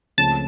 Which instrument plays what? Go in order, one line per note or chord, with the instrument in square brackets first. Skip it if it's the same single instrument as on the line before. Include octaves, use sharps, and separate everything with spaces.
[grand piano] C#2 C#3 F3 A3 C4 [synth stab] A5